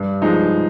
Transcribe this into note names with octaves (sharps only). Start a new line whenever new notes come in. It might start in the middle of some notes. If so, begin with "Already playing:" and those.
Already playing: G2
F3 G#3 D#4